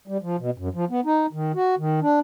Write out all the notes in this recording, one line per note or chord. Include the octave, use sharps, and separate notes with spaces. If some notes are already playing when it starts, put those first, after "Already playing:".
G3
F3
B2
F#2
F3
B3
D#4
D#3
F#4
D#3
D4